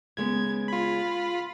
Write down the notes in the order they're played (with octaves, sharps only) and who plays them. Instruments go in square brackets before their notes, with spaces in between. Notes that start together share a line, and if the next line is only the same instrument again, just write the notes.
[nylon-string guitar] C#3 G#3 B3 [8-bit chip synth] G#6
[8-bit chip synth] F4 B5